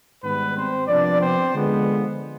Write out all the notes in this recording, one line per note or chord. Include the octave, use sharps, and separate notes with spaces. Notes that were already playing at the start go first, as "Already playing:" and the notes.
G#2 D#3 G3 B3 B4
C4 C5
C3 F3 B3 D4 D5
C4 C5
D3 F3 G#3 B3